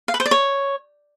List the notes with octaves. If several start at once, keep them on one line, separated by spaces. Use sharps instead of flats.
F5
B4
C5
D5
C#5